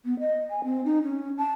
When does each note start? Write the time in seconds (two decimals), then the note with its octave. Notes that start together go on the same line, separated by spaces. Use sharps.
0.05 B3
0.20 D#5
0.50 G#5
0.64 C4
0.85 D#4
1.03 C#4
1.38 A5